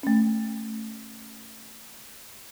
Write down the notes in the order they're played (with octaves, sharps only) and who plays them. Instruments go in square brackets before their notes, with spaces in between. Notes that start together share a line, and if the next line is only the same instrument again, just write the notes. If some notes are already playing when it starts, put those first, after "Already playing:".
[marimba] A3 C#4